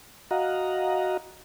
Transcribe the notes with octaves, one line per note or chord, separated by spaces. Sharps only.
F#4 D#5 F5 F#5 A#5